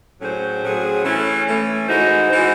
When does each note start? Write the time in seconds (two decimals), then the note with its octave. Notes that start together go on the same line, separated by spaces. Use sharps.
0.20 A2 F#3 C#4 G#4 C5
0.62 A2 F#3 C#4 G#4 C5
1.04 E3 A3 C#4
1.45 E3 A3 C#4
1.88 E3 G#3 D#4 F#4 C5
2.30 E3 G#3 D#4 F#4 C5